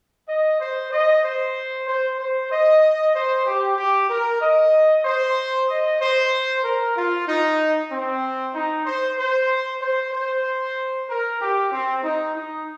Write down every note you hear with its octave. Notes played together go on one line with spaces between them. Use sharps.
D#5
C5
D#5
C5
C5
C5
D#5
C5
G4
G4
A#4
D#5
C5
D#5
C5
A#4
F4
D#4
C4
D#4
C5
C5
C5
C5
A#4
G4
C4
D#4
D#4